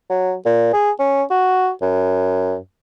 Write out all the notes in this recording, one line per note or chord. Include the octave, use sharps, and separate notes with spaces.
F#3
A#2
G#4
C#4
F#4
F#2